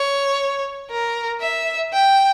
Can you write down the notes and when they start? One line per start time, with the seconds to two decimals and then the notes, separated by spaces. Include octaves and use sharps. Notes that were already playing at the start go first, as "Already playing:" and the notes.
Already playing: C#5
0.91 A#4
1.41 E5
1.93 G5